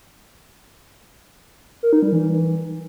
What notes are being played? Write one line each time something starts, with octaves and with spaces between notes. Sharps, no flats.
A#4
D#4
G3
E3